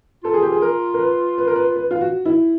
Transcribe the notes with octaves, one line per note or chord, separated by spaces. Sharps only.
F4 A4
G#4
G4
G#4
A#4
A#4
B4
B4
A#4
B4
B4
F4
F#4
E4